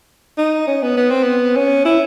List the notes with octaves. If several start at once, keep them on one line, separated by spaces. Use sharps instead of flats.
D#4
C#4
B3
B3
C4
B3
C#4
E4